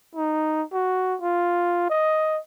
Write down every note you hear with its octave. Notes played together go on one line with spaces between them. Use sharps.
D#4
F#4
F4
D#5